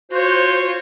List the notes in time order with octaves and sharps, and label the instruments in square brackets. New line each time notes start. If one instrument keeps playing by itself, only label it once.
[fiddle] F4 C#5 [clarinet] F#4 [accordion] C5